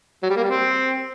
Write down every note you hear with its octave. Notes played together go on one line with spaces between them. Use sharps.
F#3
G3
A#3
G3
C4